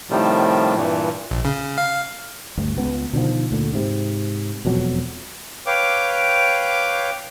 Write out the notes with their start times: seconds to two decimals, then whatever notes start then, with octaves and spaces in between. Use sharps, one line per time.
0.10 A2 C3 D#3 F3 G3
0.75 G2 A#2 E3
1.31 A#1
1.45 C#3
1.78 F5
2.58 D2 G2
2.77 C#2 B3
3.13 B2 D3 D#3 F3
3.51 D2 A#2 D3
3.73 G#2 C3
4.65 E1 F2 B2 F#3
5.66 B4 C#5 F5 G5 D6